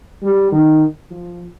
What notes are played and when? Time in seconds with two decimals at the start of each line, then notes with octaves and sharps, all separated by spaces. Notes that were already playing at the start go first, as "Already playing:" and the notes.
0.23 G3
0.52 D#3
1.10 F3